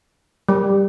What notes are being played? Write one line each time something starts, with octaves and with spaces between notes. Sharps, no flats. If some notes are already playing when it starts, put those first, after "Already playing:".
G3